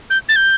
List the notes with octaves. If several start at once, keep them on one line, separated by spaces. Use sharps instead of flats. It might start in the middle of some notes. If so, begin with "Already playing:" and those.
G6
A6
G6